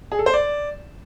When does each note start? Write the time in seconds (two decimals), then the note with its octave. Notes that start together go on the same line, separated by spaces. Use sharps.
0.12 G#4
0.19 A4
0.26 C5
0.34 D5